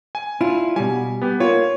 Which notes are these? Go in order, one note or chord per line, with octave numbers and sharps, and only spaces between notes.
G#5
D4 E4 F4
B2 G3 G#5
B3 G4
A#3 F4 C#5